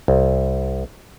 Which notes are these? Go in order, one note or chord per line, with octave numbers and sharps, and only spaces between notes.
C2